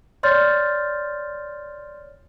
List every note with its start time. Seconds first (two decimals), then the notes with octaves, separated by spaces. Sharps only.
0.23 C#5 D5 C6 F6 G6 A6